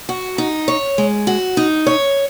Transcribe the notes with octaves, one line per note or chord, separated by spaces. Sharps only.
F#4
D#4
C#5
G#3
F#4
D#4
C#5